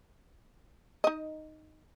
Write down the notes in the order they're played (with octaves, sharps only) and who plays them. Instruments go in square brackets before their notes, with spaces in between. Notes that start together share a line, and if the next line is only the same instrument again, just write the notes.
[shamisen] D#4 D#5